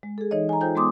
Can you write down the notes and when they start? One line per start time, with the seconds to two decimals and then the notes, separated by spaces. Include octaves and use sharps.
0.03 G#3
0.18 G#4 A4
0.31 E3 D#4 C#5 D#5
0.49 G#5 A#5
0.61 D#4 F4 A4 C5 G5 G6
0.75 G#3 B3 C6 D6 D#6